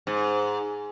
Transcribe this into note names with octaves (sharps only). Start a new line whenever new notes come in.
G#2